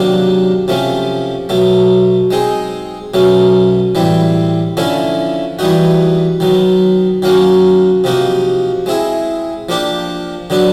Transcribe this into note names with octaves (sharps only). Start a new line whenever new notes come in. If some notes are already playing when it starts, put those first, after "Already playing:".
Already playing: C3 D#3 F#3 A#3 D4
C3 F3 A3 C#4
B2 F#3 A3
G#3 C4 D#4 G#4
B2 F#3 A3 C#4
A2 E3 G3 C4
D3 F3 A3 C#4 E4
E3 G3 B3 D#4 F#4
D#3 F#3 B3
D#3 F#3 A#3 C#4 F#4
C3 F3 A#3 D#4 F#4
G#3 C4 E4 G#4
F3 A#3 D4 G4
D3 F#3 B3 D4